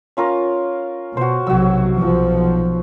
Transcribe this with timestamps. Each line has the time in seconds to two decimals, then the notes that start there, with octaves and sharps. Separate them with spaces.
0.17 C#4 F4 A#4
1.17 B2 F#4 C5
1.47 B1 C3 F#3 F#4 E6
1.96 B1 F3